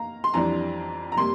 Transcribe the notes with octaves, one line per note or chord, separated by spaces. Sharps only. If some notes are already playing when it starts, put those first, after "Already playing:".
Already playing: A#3 F5 A#5
C6
F2 E3 G3 D4 A#5
A#5
C3 G3 A#3 C6